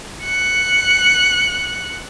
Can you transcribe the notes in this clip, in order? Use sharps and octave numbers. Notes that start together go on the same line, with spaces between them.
F#6 C#7